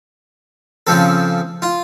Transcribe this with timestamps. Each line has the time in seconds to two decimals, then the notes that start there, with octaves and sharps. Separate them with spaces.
0.87 C#3 F3 C4 A4
1.62 F4